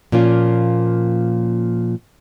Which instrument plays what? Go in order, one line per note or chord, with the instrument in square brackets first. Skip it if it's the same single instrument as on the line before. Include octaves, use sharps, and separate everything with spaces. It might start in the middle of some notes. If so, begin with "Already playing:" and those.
[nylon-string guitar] A#2 F3 A#3 C#4 F4